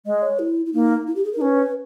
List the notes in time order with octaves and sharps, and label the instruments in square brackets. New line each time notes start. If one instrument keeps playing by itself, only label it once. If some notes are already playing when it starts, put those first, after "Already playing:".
[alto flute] G#3 [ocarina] D#5
[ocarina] C#5
E4
E4
[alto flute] A#3 [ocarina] D#4
[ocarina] E4
G4
G#4
A#4
[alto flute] D#4
[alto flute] C#4 [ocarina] B4